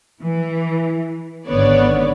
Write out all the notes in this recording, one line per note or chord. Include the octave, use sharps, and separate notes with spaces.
E3
G#1 D3 B3 C#5 D5